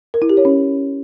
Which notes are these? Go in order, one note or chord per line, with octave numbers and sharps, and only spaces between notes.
A#4
E4
G4
C#5
C#4